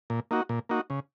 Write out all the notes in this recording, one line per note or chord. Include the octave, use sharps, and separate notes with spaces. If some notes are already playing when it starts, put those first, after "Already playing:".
A#2
A#3 D#4 F#4
A#2
A#3 D#4 F#4
C#3